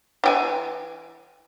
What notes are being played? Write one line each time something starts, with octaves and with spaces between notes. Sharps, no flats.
E3 G4 G#5